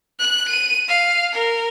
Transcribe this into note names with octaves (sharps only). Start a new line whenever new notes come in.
F#6
D#7
F5
A#4